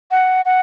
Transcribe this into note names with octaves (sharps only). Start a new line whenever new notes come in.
F#5
F#5